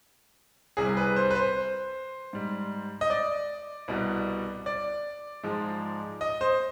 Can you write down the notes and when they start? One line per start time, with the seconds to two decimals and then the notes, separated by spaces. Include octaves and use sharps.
0.77 C2 C3 G3 G#4
0.97 B4
1.16 C5
1.31 B4
1.35 C5
2.33 G#2 G3
3.01 D#5
3.10 D5
3.88 C2 B2 G3
4.66 D5
5.43 G#2 F3 G#3
6.21 D#5
6.41 C5